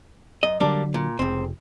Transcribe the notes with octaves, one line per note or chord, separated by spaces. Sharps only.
F#2 D#5
D3 F#3 G3 A#3 D4
A#2
F1 C#2 C4